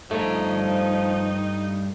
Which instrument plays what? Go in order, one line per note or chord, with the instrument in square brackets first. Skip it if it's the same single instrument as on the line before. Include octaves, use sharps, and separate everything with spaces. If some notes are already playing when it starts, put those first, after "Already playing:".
[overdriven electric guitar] G2 A#5 [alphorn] F3 [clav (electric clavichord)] A3 [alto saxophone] D#4